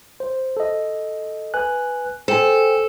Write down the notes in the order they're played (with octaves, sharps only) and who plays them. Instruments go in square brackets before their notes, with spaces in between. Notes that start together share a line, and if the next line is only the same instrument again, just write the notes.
[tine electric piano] C5
A4 D#5
B4 G#5 F#6
[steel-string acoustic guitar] A4 [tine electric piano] C5 G5 G#5